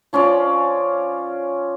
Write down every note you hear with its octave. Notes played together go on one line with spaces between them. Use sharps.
F3 C#4 F4 D5